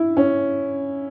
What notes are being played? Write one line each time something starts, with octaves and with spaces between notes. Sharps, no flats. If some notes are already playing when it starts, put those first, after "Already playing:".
Already playing: E4
C#4